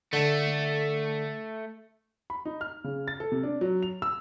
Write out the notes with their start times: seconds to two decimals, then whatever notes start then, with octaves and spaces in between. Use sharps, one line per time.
0.13 D3 A3
2.30 B5
2.45 D#4
2.61 F6
2.84 C#3
3.08 A6
3.20 A4
3.32 C3
3.43 D4
3.61 F#3
3.83 F7
4.02 E6